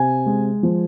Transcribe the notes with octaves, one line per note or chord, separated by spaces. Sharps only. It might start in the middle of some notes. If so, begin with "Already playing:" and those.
Already playing: C3 G#5
G#3
F3